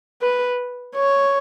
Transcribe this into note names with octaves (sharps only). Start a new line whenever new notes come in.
B4
C#5